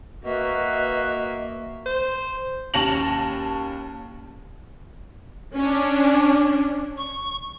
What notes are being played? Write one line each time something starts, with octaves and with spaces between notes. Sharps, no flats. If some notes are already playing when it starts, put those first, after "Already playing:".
A#3 F#4 B4 D#5 E5
C5
D#2 C#4 A5 A#6 F7 F#7
C#4 D4
C#6